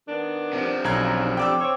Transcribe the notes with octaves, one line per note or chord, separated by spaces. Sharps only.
D#3 B3 D4
C3 F3
B1 C#3 D4 A#5 G#6
G3 D4 G5 D6 E6
C4 C#5